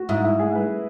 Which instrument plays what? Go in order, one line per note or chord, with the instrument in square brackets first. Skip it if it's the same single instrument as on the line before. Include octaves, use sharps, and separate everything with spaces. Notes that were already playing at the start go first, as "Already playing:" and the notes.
Already playing: [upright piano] F#4
[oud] G#2 [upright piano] E4
[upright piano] E4
G#4
B4